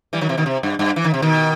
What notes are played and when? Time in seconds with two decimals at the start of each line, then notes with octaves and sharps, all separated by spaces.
0.13 E3 G3
0.21 D#3 F#3
0.29 C3 E3
0.37 B2 D#3
0.46 C3
0.63 G2
0.79 G2
0.96 E3
1.04 D#3
1.14 C3
1.22 B2 D#3